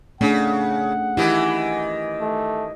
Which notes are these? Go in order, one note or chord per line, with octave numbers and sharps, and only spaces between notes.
C#3 A3 C#4 D4 F#5
D#3 E3 E4 G4
A3